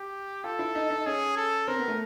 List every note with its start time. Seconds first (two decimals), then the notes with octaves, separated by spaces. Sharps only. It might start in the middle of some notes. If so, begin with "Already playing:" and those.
Already playing: G4
0.44 F4 A4
0.59 E4
0.75 D#4
0.90 D#4
1.06 C#4 G#4
1.37 A4
1.68 C4 A#4
1.79 B3
1.88 A3